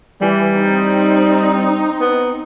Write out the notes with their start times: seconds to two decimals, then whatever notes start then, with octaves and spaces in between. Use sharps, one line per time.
0.21 E3 G3
0.53 C4 D#4
2.00 B3